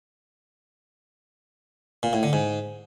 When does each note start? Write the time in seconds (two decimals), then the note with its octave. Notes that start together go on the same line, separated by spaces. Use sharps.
2.03 A#2
2.13 A2
2.23 D3
2.33 G#2